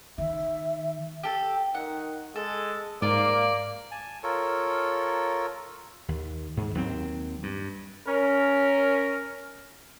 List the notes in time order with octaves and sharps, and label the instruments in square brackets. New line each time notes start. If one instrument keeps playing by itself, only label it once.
[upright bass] D#3 [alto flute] E5
[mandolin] G4 A4
[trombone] D#3 [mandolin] F#5
[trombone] G#3 [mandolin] A4
[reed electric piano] G#2 [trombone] A#3 [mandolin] F4 A#4 [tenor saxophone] D5
[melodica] G#5 A5
F4 A4 A#4 C#5
[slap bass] D#2
G#2
D#2 F#3 C4
G2
[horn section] C#4 A#4